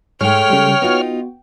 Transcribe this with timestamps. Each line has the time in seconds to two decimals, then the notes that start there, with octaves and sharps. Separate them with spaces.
0.21 G#2 G#3 A3 C#5 G5 F6
0.50 C#3 G3
0.82 B3 D#4 F4 F#4